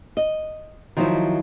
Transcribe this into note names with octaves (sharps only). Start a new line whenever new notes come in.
D#5
D#3 F3 F#3 D#4 E4